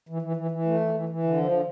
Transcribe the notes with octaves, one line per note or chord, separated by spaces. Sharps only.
E3
E3
E3
E3
A3
E3
E3
E3
D3
F3
D3